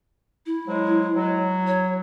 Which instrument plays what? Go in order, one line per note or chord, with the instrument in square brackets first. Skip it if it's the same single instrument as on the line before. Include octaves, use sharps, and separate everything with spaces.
[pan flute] E4
[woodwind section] G#2 F#3 G#3
F#3
[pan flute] C#5